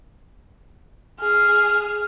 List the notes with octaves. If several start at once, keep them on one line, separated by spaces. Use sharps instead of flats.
G#4 F6